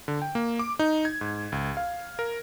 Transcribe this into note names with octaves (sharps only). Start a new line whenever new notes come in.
D3
G5
A#3
D6
D#4
G#6
G#2
C#2
F5
A#4